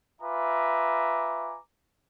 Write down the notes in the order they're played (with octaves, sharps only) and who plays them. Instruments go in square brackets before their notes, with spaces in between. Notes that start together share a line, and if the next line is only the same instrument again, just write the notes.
[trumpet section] F4 B4 E5 G#5 A#5 D6